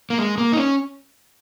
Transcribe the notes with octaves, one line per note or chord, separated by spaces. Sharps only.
A#3
G#3
A#3
D#4
C#4